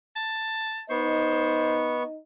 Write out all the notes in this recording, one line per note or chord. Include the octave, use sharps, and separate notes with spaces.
A5
B3 D#4 C5 D#5 C#6